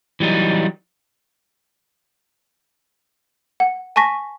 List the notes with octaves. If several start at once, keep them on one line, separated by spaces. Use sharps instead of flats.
E3 F#3 G3 D#4
F#5
G#5 A5 C#6 A#6 B6